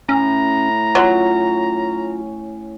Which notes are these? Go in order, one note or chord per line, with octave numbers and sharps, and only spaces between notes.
A2 C#4 A#5
F#3 C#4 F4